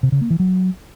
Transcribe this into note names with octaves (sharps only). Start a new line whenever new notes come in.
C3
C#3
A#3
E3
F#3